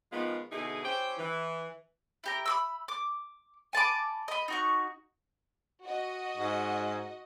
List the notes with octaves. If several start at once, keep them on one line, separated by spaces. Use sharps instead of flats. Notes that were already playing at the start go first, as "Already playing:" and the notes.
D#3 F3 G#3 B3 D#4 F4
B2 D3 D#4 E4 G#4
C#4 E4 G4 C5 G5
E3
E4 G4 A#5
B5 D6 E6
D6
G#5 A5 B5 D6
D#5 B5
D#4 F#4 C#6
F#4 D#5
G#2